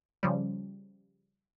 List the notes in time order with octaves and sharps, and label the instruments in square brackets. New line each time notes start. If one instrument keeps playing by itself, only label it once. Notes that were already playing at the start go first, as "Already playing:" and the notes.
[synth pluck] C#3 F3 G3